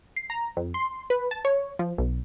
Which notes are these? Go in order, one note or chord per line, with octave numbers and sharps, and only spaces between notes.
C7
A#5
F2
C6
B4
A5
C#5
F3
B1